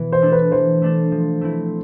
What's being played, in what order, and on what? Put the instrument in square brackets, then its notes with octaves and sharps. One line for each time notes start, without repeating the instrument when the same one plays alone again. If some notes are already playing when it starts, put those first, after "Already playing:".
Already playing: [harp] B2 E3 B3
[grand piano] C5
[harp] A3 D4 A4
[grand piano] B4
[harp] E3 [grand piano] C5
[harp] A3 D4 A4
F3
A3 C4 E4